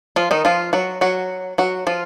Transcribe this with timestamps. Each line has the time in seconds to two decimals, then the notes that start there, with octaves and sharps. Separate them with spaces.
0.16 F3 F4
0.31 D#3 D#4
0.45 F3 F4
0.73 F#3 F#4
1.01 F#3 F#4
1.58 F#3 F#4
1.87 F3 F4